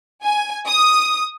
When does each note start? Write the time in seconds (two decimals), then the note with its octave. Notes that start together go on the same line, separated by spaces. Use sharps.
0.23 G#5
0.67 D#6